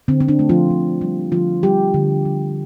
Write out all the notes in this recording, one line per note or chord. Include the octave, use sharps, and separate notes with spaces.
D3 C4
C4
D4
A3
F3 F4
D3
G3
D3 F3 F4
G3 G4
D3
G3